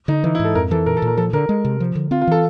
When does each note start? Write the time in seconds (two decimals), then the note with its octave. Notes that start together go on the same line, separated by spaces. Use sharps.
0.08 D3 D#4
0.24 E3 D#4
0.35 E4
0.39 G#2
0.45 A4
0.55 F2 A#4
0.71 E3 A4
0.86 A#2 A#4
0.97 A4
1.02 A#2
1.07 A#4
1.17 F3 A4
1.33 D3 A#4
1.49 G#3
1.65 C3
1.80 F3
1.95 D3
2.11 C4 F4
2.21 F4
2.27 E3 A4